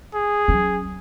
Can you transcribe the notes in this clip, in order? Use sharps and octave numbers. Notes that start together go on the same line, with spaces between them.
G#4
F#3 C#4